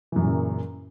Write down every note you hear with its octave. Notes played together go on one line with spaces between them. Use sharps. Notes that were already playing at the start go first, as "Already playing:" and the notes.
F#2 A#2 C#3 E3 F#3